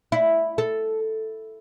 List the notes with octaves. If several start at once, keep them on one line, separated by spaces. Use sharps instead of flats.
E4
A4